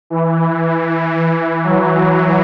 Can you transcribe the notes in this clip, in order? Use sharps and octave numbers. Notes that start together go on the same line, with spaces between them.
E3
F#3